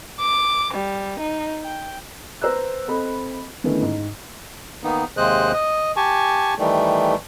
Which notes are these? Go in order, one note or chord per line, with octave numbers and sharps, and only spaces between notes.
D6
G3
D#4
G5
B4 C5 A#5 E6 F#6
C4 A4 D#5 B5
D3 D#3 A3 B3 C#4 E4
G#2
D#3 A#3 B3 D#4
D#2 C3 G#3 C5 D#5 F#6
D#5
G4 G#5 A5 C#6
D#3 E3 G3 A3